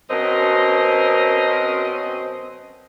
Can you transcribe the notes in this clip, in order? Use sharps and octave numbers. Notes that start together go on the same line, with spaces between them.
F#2 B2 C4 C#4 A#4 D#5